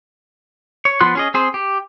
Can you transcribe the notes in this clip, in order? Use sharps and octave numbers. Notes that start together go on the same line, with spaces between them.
C#5
F3 B3 F4 C6 F#6
C#4 G#4 D#5
C4 G#4 C5
G4